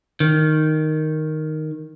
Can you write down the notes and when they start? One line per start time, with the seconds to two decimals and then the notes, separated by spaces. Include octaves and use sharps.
0.20 D#3